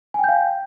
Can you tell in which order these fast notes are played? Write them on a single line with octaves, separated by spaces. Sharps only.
G#5 G5 G6 F5